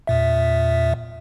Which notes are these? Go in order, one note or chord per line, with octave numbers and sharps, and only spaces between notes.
E2 A#2 E5